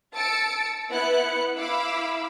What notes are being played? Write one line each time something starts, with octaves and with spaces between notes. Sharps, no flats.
A5 E6 A6 C#7 D7
B3 E4 F#6 C#7
E4 F5 B5 D6 E6